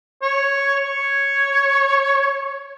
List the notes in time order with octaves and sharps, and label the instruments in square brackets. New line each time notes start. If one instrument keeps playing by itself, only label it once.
[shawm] C#5
C#5